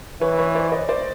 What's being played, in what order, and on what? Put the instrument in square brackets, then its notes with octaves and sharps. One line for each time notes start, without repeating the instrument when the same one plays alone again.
[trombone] E3 [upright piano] B4 C#5
[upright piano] B4 C#5
C5 D5
C#5 D#5
C5 D5